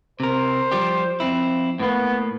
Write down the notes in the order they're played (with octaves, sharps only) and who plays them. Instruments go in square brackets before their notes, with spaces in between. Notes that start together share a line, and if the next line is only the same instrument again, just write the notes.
[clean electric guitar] C3 A#4 [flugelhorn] C5
[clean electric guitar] F3 G3 G4
F2 C4 E4
[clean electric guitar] A2 A#3 [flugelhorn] B3